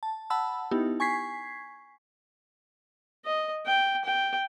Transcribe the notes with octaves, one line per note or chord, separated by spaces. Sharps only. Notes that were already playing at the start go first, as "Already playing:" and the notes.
A5
F#5 A5 B5 E6
B3 D#4 E4 G4
G#5 C#6 G#6 B6 C7
D#5
G5
G5